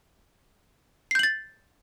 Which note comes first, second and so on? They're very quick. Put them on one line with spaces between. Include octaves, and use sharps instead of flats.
C7 G6 F#7 A6